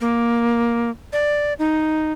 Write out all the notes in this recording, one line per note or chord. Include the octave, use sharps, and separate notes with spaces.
A#3
D5
D#4